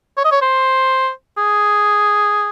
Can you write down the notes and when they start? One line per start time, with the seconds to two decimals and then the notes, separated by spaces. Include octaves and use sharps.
0.17 C#5
0.24 D#5
0.32 C#5
0.42 C5
1.38 G#4